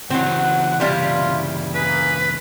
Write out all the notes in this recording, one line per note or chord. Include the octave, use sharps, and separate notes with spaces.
C#2 E3 F#3 C4 F#5
C3 G3 E4 F4
A#3 G#4 B4